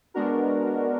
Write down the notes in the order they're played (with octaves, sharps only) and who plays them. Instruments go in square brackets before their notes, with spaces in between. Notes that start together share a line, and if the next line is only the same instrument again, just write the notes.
[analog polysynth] G#3 B3 D4 F#4 A#4